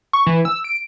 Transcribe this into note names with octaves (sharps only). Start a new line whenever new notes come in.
C#6
E3
E6
D7